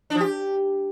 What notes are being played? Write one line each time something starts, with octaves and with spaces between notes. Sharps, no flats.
D4
F3
G4